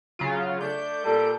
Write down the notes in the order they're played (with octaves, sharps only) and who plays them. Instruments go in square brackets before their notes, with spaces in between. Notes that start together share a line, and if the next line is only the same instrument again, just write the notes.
[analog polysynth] C#3 F#3 F4
[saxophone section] A3 D4 [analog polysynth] G6
[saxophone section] A#2 G3 [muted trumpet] A4